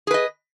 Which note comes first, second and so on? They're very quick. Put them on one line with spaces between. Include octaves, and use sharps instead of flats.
G#4 B4 D#5